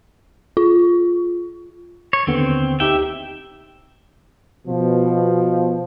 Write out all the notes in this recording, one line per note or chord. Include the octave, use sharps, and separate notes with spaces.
F4
C#5
D#2 D3 B3 C4
D2 D#4 G4 E5 G5
B2 F3